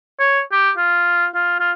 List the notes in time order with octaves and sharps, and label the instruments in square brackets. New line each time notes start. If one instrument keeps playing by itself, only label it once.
[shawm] C#5
G4
F4
F4
F4